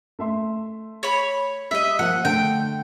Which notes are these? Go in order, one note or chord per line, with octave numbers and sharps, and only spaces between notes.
A3 E5 C6
C#5 B5
G3 D#5 E5
F3 A#3 F4 F#5
D3 A3 G5